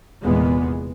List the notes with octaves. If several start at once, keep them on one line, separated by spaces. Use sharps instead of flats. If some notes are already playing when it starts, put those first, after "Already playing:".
F1 E2 A#2 G#3 B3